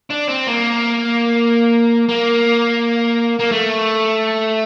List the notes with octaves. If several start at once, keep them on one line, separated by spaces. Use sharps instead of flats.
D4
C4
A#3
A#3
A#3
A3